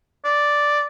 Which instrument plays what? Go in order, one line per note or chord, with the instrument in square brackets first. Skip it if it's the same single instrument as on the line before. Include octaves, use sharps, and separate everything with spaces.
[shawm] D5